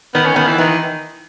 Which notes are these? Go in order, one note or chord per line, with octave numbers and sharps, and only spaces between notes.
D#3 B3
C#4
D#3 B3
E3
D#3 E3